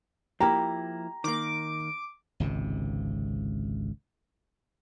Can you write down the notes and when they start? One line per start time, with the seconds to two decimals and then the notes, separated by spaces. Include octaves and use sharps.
0.40 F3 A#3 E4 G4 A#5
1.24 D#3 A#3 D6
2.40 G#1 C#2 C3